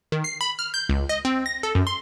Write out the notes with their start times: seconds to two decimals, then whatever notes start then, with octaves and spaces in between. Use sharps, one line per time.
0.12 D#3
0.24 C7
0.41 B5
0.59 F6
0.74 G6
0.89 C#2
1.09 D#5
1.25 C4
1.46 A#6
1.63 A4
1.75 F#2
1.87 C6